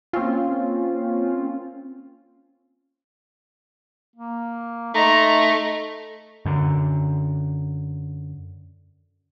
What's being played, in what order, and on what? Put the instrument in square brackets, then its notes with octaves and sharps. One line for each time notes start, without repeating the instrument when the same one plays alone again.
[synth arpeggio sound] A#3 C4 C#4 F4
[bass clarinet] A#3
[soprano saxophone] A3 [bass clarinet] D#4 [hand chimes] D#5 C6 [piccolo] A#5
[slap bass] F#2 D3